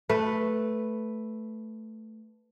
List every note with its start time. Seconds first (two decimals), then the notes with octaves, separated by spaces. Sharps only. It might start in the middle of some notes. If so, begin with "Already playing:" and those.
0.09 A3 B4